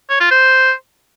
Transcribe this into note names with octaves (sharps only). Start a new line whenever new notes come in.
C#5
F4
C5